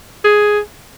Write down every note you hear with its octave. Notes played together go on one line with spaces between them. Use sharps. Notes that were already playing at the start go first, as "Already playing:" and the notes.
G#4